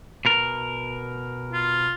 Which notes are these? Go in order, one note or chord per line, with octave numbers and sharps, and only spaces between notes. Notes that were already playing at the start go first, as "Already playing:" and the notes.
B2 A#4
F4